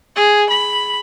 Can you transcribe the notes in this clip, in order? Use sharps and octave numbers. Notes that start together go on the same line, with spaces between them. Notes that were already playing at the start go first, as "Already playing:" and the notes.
G#4
B5